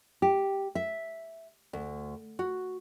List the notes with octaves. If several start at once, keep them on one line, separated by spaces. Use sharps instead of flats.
G4
E5
D2
F#4